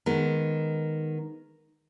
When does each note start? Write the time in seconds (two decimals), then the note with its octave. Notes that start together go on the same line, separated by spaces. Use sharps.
0.06 D#3 G#3 B3